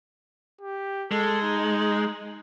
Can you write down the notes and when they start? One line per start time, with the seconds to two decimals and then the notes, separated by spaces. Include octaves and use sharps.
0.61 G4
1.11 G#3 A4
1.43 D#4